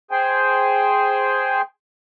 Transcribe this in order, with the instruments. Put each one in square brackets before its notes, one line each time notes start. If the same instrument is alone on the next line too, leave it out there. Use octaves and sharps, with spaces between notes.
[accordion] G#4 C5 G5 G#5